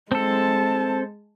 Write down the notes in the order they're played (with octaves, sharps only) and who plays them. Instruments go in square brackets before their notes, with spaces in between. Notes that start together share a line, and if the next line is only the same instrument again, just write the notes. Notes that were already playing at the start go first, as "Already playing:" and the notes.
[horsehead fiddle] G#3 A5 [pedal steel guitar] C4 A4